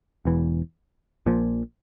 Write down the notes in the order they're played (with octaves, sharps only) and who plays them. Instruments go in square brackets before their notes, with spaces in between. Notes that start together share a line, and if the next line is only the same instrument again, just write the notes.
[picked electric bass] E1 E2 E3
A#1 A#2 F3